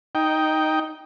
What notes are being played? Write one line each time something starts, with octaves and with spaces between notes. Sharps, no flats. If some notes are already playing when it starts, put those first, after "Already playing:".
D#4 G5